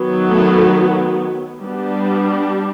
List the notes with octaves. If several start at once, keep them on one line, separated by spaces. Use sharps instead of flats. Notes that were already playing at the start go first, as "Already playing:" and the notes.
Already playing: D#3 F#3 B3
A3 A4
G3 B3 D4